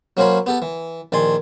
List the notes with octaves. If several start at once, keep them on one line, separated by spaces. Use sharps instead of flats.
F#3 A#3 C#4 C5 C#5 B5
B3 G4 A4
E3
A#1 D#3 D5 G#5 C6